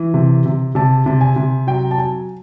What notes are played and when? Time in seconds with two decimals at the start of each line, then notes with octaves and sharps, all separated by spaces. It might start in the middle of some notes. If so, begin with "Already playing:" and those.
Already playing: E3
0.14 C3
0.46 C3
0.75 C3 A5
1.06 C3
1.21 G#5
1.36 C3
1.67 F#3 G5
1.91 A5
1.98 F#3 G#5